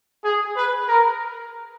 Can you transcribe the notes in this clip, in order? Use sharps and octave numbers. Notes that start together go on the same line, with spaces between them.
G#4
B4
A#4